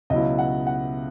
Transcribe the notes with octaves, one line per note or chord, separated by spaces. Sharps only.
C#2 B2 F#3 C#4 E4 D#5
F#5
F#5